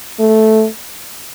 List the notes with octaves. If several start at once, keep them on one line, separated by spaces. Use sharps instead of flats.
A3